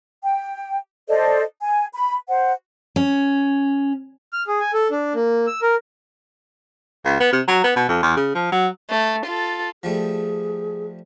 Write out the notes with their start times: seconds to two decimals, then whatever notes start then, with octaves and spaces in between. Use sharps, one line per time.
0.23 G5
1.08 A4 C5 D5 D#5
1.61 G#5
1.93 B5
2.28 C5 F#5
2.96 C#4
4.33 F6
4.47 G#4
4.60 G#5
4.74 A4
4.91 D4
5.14 A#3
5.47 E6
5.62 A#4
7.05 C#2
7.20 B3
7.33 C3
7.48 F#3
7.64 B3
7.76 B2
7.89 F2
8.03 E2
8.17 C#3
8.35 F3
8.52 F#3
8.90 A3
9.26 F4 A4
9.83 F3 G3 A3 G#4